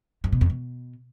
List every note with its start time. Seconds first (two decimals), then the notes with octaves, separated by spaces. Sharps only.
0.24 F#2
0.32 B2
0.41 F2
0.50 B2